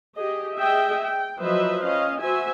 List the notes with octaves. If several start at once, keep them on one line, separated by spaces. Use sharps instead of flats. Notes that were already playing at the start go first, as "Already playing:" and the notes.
G4 G#4 D#5
G#4 D#5 E5 G5
G5
F3 F#3 B4 C5 D#5 E5
C#4 D#5 F5
F#4 C5 E5 G#5